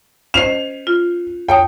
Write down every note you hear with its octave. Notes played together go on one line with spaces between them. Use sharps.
C#4 C5 D#5 C7 F7
F4
F2 C#5 G5 D#6